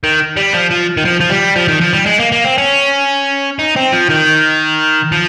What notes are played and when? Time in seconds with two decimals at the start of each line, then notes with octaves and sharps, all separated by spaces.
0.04 D#3
0.37 G3
0.54 F3
0.71 F3
0.97 D#3
1.05 F3
1.20 F3
1.30 G3
1.56 F3
1.68 D#3
1.81 F3
1.93 G3
2.06 G#3
2.20 A#3
2.32 A#3
2.45 C4
2.58 C#4
3.59 D#4
3.76 C4
3.92 F3
4.09 D#3
5.12 F3